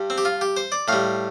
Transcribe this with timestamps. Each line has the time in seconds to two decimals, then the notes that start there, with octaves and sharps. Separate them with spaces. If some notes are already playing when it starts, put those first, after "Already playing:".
Already playing: G2 G3
0.10 C4
0.18 G4
0.25 F4
0.41 G4
0.57 C5
0.72 D5
0.88 A2 G3 F5